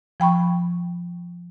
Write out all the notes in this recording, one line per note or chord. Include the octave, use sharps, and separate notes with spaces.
F3 G5 B5 C#6